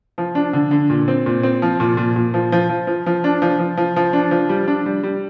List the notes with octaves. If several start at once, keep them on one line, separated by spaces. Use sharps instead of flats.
F3
D4
D3
D3
A#2
C4
A#2
C4
F3
A#2
A#2
A#2
F3
F3
F3
F3
F3
D4
F3
F3
F3
F3
D4
F3
G3
D4
G3
G3